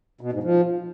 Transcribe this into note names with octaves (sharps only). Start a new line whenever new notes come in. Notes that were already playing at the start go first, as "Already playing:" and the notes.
B2
G#2
F3